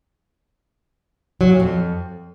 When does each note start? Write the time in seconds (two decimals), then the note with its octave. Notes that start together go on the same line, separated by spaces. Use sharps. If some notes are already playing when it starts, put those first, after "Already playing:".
1.41 F#3
1.50 A#2
1.60 F2